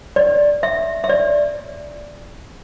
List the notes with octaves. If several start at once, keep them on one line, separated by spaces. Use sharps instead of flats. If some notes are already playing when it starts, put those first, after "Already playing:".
D5
E5
E5
D5